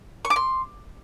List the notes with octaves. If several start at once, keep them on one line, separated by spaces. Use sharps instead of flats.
C#6
D6
C6